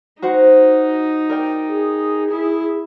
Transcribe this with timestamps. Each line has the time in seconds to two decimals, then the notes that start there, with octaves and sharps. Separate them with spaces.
0.22 D#4 F#4 C5 F#5
1.29 A#4 D5 G5
1.68 G#4
2.31 E4